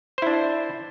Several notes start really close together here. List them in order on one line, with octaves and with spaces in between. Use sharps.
C5 E4 D4